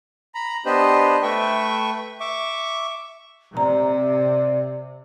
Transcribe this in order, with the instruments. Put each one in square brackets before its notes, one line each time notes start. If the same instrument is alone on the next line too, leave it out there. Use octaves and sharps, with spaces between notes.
[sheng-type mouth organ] A#5 B5
B3 D4 G4 B4 C5 D#5
A3 B4 E5 G5 C#6
E5 C#6 D6
[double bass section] C3 [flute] D5 [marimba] A#5